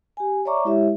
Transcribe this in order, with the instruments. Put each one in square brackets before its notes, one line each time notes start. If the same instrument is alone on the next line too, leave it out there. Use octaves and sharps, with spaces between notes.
[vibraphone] G4 G#5
C#5 D5 E5 A#5 C#6 D6
G#3 E4 G4 C#5 E5